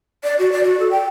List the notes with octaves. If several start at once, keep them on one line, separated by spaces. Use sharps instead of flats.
D5
F#4
D5
F#4
A4
G5